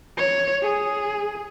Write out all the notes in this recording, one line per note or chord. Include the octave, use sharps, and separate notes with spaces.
C#5
G#4